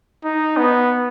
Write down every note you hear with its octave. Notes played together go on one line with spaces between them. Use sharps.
D#4
B3